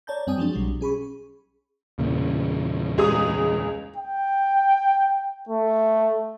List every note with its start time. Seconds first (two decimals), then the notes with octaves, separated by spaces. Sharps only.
0.07 C#5 D5 A5 A#5 G6
0.27 F#2 G3 C4 G5 G#5 D#6
0.38 F3 F#3 G#3 D4
0.53 B1 B2 F#3 G3
0.81 C#4 G#4 B5 C#6
1.99 E2 A#2 C#3
2.98 C#2 G#4 D#6
3.96 G5
5.49 A3